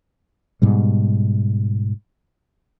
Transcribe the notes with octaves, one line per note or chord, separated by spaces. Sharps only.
G#2 B2 G3